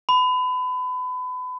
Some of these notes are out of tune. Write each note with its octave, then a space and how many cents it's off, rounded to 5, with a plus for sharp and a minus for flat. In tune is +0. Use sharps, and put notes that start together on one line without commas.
B5 +30